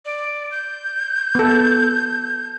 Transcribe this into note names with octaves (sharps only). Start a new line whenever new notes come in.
D5
G6
B3 A4